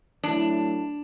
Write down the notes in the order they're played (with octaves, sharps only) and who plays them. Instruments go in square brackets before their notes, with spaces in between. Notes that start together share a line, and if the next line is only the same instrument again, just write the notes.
[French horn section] F#3 A3 E4 [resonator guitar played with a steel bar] D4